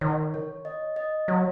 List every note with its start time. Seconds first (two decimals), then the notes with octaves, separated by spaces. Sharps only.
0.01 D#3 C#5
0.34 C#5
0.65 D#5
0.96 D#5
1.28 F#3 C#5